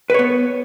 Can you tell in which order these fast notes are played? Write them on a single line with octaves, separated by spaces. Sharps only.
B4 C#5 B3